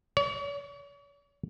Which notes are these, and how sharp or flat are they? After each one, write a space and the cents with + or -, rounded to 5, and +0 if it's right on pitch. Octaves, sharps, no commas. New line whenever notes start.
C#5 +45